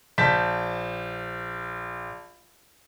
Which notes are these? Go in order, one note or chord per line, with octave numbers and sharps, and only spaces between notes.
A#1 A5 G6 B6